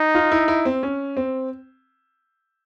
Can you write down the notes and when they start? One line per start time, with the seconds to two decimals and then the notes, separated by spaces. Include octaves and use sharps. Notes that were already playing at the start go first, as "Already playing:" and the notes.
Already playing: D#4
0.15 F4
0.32 E4
0.48 E4
0.65 C4
0.83 C#4
1.17 C4